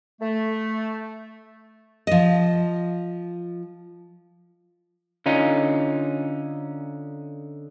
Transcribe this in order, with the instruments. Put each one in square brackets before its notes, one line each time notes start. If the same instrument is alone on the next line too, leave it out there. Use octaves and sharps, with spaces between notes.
[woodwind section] A3
[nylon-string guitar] F3 D#5
[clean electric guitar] D3 C#4 D#4 F4